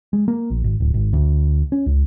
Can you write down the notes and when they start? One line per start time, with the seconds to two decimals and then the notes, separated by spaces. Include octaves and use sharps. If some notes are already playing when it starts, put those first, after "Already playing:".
0.13 G#3
0.28 A#3
0.50 A#1
0.64 G#1
0.80 D1
0.94 G#1
1.13 D2
1.72 C#4
1.86 C#2